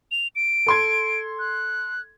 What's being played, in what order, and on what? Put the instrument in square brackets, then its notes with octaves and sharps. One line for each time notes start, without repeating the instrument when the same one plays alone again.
[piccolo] F7
D7
[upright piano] A4 C6 G#6
[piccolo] F#6